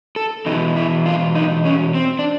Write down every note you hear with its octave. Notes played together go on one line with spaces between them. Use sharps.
A4
E2 B2 D#4
E4
F4
D#4
C#4
C4
D4